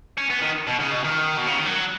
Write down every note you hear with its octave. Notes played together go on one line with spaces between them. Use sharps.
C#4
B3
D#3
B2
C#3
B2
D#3
B2
C#3
D#3
F#3